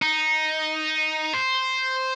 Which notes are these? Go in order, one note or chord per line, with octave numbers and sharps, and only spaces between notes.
D#4
C5